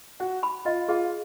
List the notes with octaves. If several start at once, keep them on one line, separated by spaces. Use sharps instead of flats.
F#4 F#5
B5
F4 D#5
F4 G#4